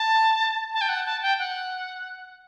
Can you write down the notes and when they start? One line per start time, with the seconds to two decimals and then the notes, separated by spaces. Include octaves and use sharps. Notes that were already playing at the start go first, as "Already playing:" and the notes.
Already playing: A5
0.73 A5
0.81 G5
0.89 F#5
1.05 A5
1.22 G5
1.39 F#5